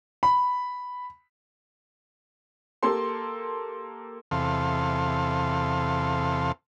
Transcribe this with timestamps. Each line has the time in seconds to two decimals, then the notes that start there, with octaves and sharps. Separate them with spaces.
0.23 B5
2.83 A#3 G4 A4 C6
4.31 E2 C3 A4 F5 C6